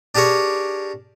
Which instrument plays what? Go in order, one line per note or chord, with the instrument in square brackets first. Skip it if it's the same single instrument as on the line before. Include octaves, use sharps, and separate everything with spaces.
[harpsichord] D4 G4 G#4 A#4 C#5